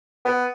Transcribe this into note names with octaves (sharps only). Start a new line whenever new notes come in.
B3